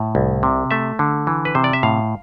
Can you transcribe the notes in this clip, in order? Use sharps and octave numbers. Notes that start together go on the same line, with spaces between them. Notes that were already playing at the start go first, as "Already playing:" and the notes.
Already playing: A2
C2
C3
A3 E5
D3
E3
B4
C3 C5
D5
E5
A2 F5